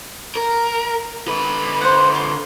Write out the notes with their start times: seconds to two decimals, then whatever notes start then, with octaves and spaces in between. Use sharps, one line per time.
0.36 A#4
1.28 D3 B4
1.81 C5 F#5
2.15 F4